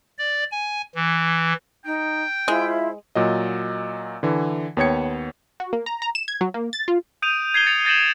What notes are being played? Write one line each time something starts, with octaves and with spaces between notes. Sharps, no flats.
D5
G#5
E3
D#4 G5
G#3 E4 F4 C5 E5
A#2 F#3 D#5
D3 E3
D#2 B3 C#5 G5 G#6 C#7
F#4
A#3
A#5
A#5
E7
G#6
F#3
A#3
A6
F4
D#6 G6 D7 D#7 F7
G#6 C7 D#7 G7
A6 C#7 F7
G6 A6 A#6 D7 E7 F#7